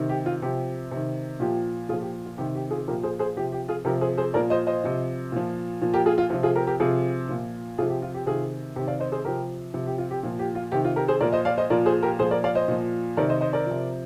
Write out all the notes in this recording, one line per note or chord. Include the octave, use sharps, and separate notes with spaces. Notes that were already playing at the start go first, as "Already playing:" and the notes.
Already playing: C3 D#3
G4
F4
C3 F3 G4
C3 D#3
A#2 F3 G4
A#2 F3 F4 G#4
G4
F4
C3 D#3 G4
G4
F4 G#4
A#2 F3 G4 A#4
G#4 C5
G#4 C5
C3 F3 G4
G4
F4 G#4
C3 F3 G4 A#4
G#4 C5
G#4 C5
A#2 F3 A#4 D5
C5 D#5
C5 D#5
C3 F3
A#2 F3
A#2 F3
G4 A#4
F4 G#4
F4
C3 F3 F4
F4 G#4
G4 A#4
G4 A#4
C3 F3 F4 G#4
A#2 F3
C3 F3 F4 G#4
G4
F4
G4
C3 D#3 F4 G#4
C3 D#3 G4
D5 F5
C5 D#5
G#4 C5
C3 F3 G4 A#4
C3 F3
G4
F4
G4
A#2 F3
G4
F4
C3 D#3 G4
F4
G4 A#4
G#4 C5
A#2 F3 A#4 D5
C5 D#5
D5 F5
C5 D#5
A#2 F3 A#4 D5
G#4 C5
G4 A#4
A#2 F3 G#4 C5
A#4 D5
D5 F5
C5 D#5
A#2 F3
C3 D#3 A#4 D5
C5 D#5
C5 D#5
A#4 D5
C3 F3